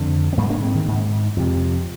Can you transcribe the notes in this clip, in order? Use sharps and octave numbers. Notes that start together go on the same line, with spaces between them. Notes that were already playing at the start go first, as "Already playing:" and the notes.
Already playing: F2 D3 G#3 C4
C4
G#2 G3 A#3
A#3 D4
G#3 C4
D#3
G#2
F2 C3